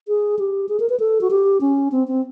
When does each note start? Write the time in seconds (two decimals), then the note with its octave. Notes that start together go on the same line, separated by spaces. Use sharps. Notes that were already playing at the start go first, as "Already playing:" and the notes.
0.08 G#4
0.39 G4
0.69 G#4
0.80 A#4
0.89 B4
1.00 A4
1.21 F#4
1.31 G4
1.61 C#4
1.92 C4
2.08 C4